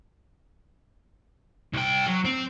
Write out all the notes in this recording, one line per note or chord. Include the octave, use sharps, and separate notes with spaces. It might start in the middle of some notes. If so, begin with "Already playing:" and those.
C2 G5
F#3
C4